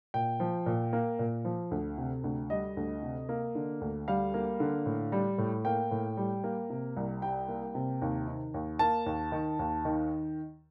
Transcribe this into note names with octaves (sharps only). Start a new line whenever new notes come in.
A#2 G5
F3
A#2
A#3
A#2
F3
D2
C3
D2
G3 D#5
D2
C3
A#3
D3
D2
G3 F5
A#3
D3
A2
G3
A2
A#3 G5
A2
G3
A#3
C3
C2
G3 G5
A#3
C3
D#2
D#3
D#2
A#3 A5
D#2
D#3
D#2
D#3